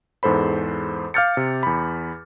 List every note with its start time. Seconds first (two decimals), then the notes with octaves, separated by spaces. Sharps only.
0.23 E2 G#2 A4 C5 B5
1.14 F5 D6 F6 G6 A6 C#7
1.37 C3
1.63 E2 B5